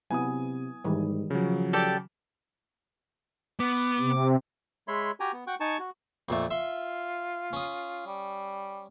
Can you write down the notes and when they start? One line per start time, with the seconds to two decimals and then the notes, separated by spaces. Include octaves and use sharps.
0.11 C3 F#3 B3 E4 G#5 D#6
0.84 G#2 D#3 E3 G3
1.30 C#3 F3 F#3
1.73 G4 A4 D5
3.60 B3 D6
3.99 C3
4.88 G#3 C#5 E5 B5 C6
5.20 F#4 G4 G5 G#5 A#5
5.33 B3
5.47 F#4 F#5 G5 C#6
5.60 D#4 G#5 A5 C#6
5.79 F#4
6.29 F2 A#2 A3
6.50 F4 E5 C6
7.53 C#4 D#6
8.06 G3